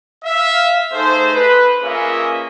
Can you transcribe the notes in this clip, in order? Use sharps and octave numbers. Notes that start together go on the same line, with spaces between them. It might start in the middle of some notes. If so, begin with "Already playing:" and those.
E5 F5
A3 D#4 G#4 C5
B4
A#3 C#4 F4 G#4 D#5 E5